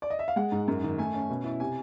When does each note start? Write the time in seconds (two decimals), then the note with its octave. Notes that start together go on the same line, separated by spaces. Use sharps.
0.02 D5
0.10 D#5
0.19 E5
0.28 F5
0.36 G#3 F#5
0.52 G#2
0.68 F#2
0.84 D#3
0.98 A3 G#5
1.14 C#4
1.30 B2
1.44 E4
1.60 C3 G#5